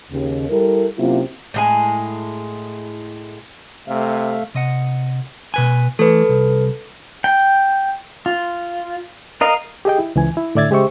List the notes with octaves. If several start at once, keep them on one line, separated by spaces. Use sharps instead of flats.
D#2 C#3
G3 E4 A4 A#4
C3 F#3 A#3 C#4 E4 F4
A2 G#3 G#5
C3 A3 E5 F5
C3 D#5 F#5
B2 B4 G#5
E3 A3 A4 B4
C2
G5
F4
A#4 D#5 F5
G4 G#4 D#5 G5
E4
C#2 E3 G#5
E4
A2 D3 D5 E5 G#6 A6
C#3 G#3 G4 C5 E5 C#6